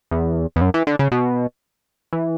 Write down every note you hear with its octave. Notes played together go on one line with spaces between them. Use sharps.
E2
E2
F#2
E3
D3
C#3
B2
E3